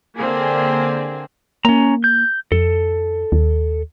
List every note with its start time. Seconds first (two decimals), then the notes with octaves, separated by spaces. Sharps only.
0.18 D3 A#3 C4 G#4
1.65 A#3 C#4 A#5
2.04 G6
2.52 F2 A4
3.32 D#2